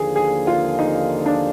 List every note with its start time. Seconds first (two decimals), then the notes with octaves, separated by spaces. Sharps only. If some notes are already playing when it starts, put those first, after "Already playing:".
Already playing: D#2 D3 F3 A#3 G#4
0.16 G#4
0.47 F4
0.79 D#4
1.26 D4